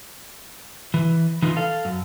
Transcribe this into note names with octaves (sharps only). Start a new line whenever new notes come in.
E3
E3 D#4 F4
A4 F5
F#2